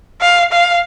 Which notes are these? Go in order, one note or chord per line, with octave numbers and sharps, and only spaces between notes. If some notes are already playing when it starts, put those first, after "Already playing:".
F5
F5